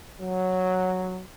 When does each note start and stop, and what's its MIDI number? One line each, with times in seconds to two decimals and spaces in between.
0.20 1.20 54